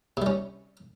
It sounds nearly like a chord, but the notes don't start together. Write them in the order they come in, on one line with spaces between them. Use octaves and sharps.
C3 G3 C#4